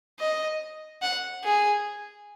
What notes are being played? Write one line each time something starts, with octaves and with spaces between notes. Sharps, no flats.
D#5
F#5
G#4